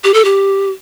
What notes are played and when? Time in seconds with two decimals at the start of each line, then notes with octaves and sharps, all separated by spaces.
0.04 G4
0.14 A4
0.25 G4